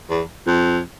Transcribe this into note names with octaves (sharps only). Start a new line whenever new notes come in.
E2
F2